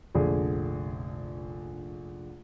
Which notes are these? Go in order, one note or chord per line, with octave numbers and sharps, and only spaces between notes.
F1 A#1 D3 G#4